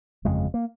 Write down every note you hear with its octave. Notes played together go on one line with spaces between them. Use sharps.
G1 F2 C#3 G#3
A#3